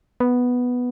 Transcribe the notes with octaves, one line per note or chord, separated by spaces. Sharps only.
B3